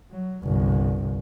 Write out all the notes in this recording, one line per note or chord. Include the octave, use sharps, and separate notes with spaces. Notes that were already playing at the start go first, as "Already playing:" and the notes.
F#3
G1 C2